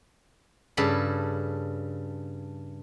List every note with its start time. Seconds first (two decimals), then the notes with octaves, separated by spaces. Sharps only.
0.77 G2 C#3 A4 B5